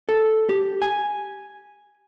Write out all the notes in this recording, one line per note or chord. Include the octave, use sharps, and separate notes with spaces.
A4
G4
G#5